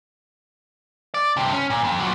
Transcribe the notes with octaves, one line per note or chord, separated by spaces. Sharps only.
D5
G2 C3
C#4
A#2
F2
A#2 F#3